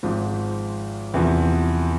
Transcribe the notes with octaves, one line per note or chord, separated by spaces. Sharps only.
G#1 G#2 F3
E2 C3 F3 B3